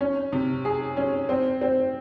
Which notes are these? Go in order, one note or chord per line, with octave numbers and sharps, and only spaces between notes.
C#4
C3
G#4
C#4
C4
C4